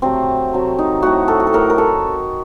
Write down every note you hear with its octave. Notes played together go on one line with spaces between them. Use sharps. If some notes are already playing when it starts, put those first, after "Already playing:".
C3 F#3 A3 C4
C3 F#3 A3
D#4
A2 A3 F#4
A4
F#4
A4
A2 A3 A#4
A#4
A4